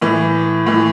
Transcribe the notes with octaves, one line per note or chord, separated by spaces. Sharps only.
A2 E3
A2 E3